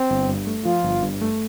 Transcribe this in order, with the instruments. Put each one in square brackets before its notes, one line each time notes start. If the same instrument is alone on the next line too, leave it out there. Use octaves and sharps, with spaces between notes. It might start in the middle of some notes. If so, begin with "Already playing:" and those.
Already playing: [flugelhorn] C4
[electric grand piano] G1
G2
A3
[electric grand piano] F3 [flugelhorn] F4
[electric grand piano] G1
G2
A3